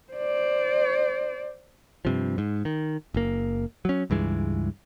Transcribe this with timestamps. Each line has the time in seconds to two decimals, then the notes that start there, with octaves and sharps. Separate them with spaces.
0.13 C5 D5
2.05 G2 C3 F3
2.38 G#2
2.65 D#3
3.14 F#1 A#3
3.85 F#3 C#4
4.10 C#2 G2 E3 G#3